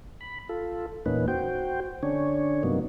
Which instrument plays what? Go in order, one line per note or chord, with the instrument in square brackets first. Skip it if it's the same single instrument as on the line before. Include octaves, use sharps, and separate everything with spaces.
[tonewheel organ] B5
F4 A4
E2 A#2 A#3 C#4 D#4 B4
F#4 C5 G5
D3 C#4 D4 C#5
G2 C3 F#3 A#3 B3 D#4